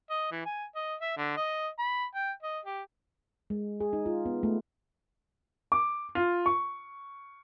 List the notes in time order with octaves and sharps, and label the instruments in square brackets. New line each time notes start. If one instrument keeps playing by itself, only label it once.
[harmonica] D#5
E3
G#5
D#5
E5
D3
D#5
B5
G5
D#5
G4
[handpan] G#3
G#4
D#4
F4
B3
A3
[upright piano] D6
F4
C#6